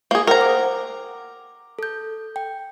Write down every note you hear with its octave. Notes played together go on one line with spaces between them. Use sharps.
A#3 G#4
A#4 C5 F#5 G5 A#5
D6
A4 G6
G5